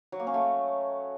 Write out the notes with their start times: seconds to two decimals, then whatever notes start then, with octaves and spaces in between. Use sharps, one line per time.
0.12 F#3
0.20 A#3
0.27 C#4
0.34 A3